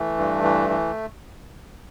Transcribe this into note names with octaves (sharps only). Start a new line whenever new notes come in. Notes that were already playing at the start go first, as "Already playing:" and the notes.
Already playing: E3 A3
G2
E3
E3